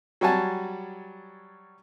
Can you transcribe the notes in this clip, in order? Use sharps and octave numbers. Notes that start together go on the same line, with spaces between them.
F#3 G3 F#4 G#5 A5